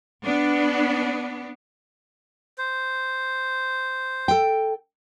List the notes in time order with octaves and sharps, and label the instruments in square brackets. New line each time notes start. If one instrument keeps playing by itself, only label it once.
[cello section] B3 D4
[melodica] C5
[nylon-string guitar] A4 G5